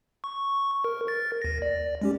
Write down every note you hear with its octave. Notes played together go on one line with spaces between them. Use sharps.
C#6
A#4
A#4 A6
D#2 A#6
D5
G#3 C#4 G4